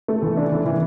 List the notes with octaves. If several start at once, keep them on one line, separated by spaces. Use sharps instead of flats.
A3
E3
D4
E3
E3